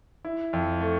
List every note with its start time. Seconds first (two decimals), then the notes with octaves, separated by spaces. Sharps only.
0.25 E4
0.53 F2
0.81 A3